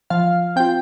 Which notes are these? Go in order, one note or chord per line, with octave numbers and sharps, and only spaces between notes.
F3 F5
C4 F4 G5